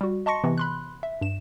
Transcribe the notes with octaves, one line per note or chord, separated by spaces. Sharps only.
G3 F#4
D#5 A5 C6 C#6 A#6 C#7
C3 E3 B3
B5 C6 F#6
E5
G2 E7